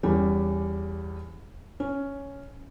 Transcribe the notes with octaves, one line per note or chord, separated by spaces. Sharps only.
E2 G3 C#4
C#4